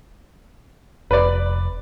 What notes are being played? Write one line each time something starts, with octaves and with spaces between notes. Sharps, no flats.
F1 B4 D5